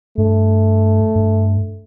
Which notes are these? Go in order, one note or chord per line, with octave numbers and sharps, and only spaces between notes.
G2 A3
G2